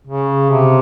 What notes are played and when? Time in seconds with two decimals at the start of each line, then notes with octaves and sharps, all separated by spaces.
0.07 C#3
0.51 C3